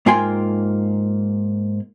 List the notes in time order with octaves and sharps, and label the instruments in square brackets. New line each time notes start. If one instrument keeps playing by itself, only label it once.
[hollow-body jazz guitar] G#2 A#3 F4 G5 G#5 C6